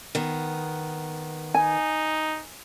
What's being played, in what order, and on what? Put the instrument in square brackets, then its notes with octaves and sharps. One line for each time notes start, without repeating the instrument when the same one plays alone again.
[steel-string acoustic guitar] D#3 B3
[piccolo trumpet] D#4 [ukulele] G#5